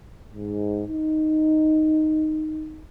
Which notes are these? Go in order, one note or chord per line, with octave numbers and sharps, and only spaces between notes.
G#2
D#4